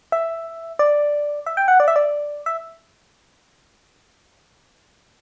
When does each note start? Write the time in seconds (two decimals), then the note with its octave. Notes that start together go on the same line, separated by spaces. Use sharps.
0.12 E5
0.79 D5
1.46 E5
1.57 G5
1.68 F#5
1.80 D5
1.88 E5
1.96 D5
2.46 E5